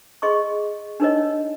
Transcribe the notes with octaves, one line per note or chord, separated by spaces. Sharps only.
G#4 D#5 C6 C#6
D4 D#4 A#4 C#5 D#5